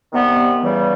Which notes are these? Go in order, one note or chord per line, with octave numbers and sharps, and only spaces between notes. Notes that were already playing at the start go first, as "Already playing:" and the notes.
C3 D#3 G3 B3
C#3 E3 G3